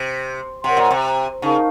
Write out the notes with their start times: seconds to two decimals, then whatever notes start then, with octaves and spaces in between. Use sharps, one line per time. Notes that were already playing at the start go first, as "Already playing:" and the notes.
Already playing: C3
0.64 C3 A#4 C#5 F#5 C6
0.77 A#2
0.91 C3
1.42 C#3 D#4 A#4 F5 A5